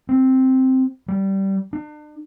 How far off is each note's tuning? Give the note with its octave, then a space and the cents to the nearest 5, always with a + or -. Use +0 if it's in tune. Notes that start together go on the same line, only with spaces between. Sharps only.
C4 +0
G3 -15
D4 +40